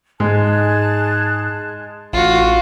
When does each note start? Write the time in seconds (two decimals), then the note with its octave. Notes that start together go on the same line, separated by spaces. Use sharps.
0.20 G#2 G#3 G#4 A5 F#6
2.13 A1 F4 F#4